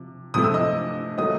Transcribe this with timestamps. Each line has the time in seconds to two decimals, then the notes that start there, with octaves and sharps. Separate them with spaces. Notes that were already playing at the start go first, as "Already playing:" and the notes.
Already playing: C3 F3
0.34 C3 F3 A3 D#6
0.44 E6
0.54 D#5 D#6
1.18 D#3 F#3 A3 D#5 D#6